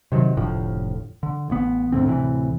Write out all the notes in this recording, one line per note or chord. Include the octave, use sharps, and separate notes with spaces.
C3 D#3 F3 F#3
F1 D2 A2 F3
D3
A1 B3
D2 G#2 D3 C4
D2 A2 C3 E3